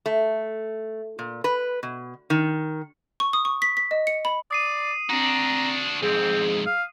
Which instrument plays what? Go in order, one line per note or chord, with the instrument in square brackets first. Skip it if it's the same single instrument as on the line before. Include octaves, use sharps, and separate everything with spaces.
[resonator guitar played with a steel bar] A3
A#2
B4
B2
D#3
[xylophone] C#6
D#6
C#6
B6
B6
D#5
C#7
B5
[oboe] D5 [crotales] D#6 C7 D#7
[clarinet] C4 [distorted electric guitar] D4 F#4 [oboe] A#5
[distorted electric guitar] F2 G#2 [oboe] C4 [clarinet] G#4
[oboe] F5